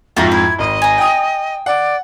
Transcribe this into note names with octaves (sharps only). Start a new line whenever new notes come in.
F2 G#2 F3 F4 F#4 E5 A#5
E4 G#6
G#1 D#5
G#5 A#5
G5 D#6
D5 F#5